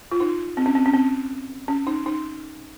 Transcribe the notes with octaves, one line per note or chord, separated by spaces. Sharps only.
F4
D#4
C4
C#4
C4
C#4
C4
C#4
D#4
D#4